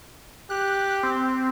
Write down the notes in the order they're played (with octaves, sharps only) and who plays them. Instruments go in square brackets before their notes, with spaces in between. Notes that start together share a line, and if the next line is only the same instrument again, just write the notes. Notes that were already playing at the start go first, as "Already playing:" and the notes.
[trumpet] G4 [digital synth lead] F#6
[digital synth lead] C4